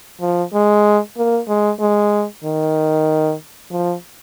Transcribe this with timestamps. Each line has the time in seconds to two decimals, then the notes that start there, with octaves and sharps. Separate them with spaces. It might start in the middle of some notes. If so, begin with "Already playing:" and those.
0.21 F3
0.54 G#3
1.17 A#3
1.48 G#3
1.80 G#3
2.44 D#3
3.71 F3